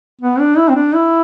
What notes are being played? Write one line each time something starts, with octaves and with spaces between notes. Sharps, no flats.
B3
D4
E4
C4
D4
E4